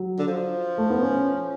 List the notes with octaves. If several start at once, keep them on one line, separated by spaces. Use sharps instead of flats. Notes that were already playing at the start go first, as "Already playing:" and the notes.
Already playing: F#3
D3
F3
A3
B3
C#4